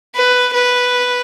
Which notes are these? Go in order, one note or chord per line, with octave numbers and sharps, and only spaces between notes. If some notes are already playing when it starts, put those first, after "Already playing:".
B4
B4